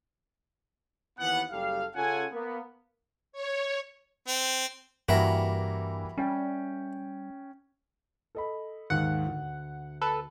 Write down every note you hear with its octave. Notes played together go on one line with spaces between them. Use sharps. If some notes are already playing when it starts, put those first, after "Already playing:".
D#2 E3 B3 F#5
F#1 G3 G4 A4 F5
C#3 C#4 F4 A4 F#5 G#5
A#3 B3
C#5
C4
G2 E3 G3 A#3 F#4 A#4 E5
G3 C#4 G5
A4 D#5 B5
D#2 G#2 F#5
D2
A4 B4